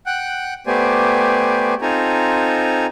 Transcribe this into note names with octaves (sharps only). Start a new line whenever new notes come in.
F#5 G5 F#6
A3 B3 G4 C5 D5 G#5
C4 D#4 F4 A4 G#5 A#5